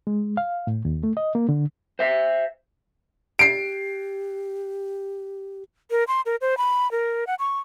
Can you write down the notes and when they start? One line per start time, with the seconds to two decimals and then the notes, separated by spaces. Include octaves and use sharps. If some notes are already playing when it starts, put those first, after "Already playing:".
0.07 G#3
0.37 F5
0.67 A2
0.85 D#2
1.03 A3
1.17 D#5
1.35 A#3
1.49 D3
1.99 C5 E5
3.39 G4 C7 D7
5.91 A#4
6.08 C6
6.26 A#4
6.41 C5
6.58 B5
6.91 A#4
7.27 F#5
7.39 C#6